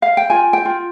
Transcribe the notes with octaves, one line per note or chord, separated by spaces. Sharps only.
F5
G5
F4 G#5
G5
F4